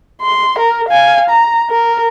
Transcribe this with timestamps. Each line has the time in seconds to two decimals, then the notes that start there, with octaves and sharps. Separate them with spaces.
0.22 C6
0.59 A#4
0.89 F5 G#5
1.30 A#5
1.70 A#4